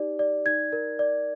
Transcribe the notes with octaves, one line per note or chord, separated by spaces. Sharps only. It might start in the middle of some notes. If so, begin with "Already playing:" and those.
Already playing: D#4 G4 D5
D5
D#4 G#6
A#4
D5